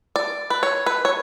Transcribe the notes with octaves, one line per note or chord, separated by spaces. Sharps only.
D5
B4
C#5
B4
C#5